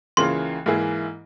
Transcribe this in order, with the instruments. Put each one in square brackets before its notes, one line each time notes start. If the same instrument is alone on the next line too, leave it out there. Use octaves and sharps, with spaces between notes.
[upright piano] C#2 C#3 E3 A#3 F4 [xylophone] C6
[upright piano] G#2 E3 A#3 E4 G#4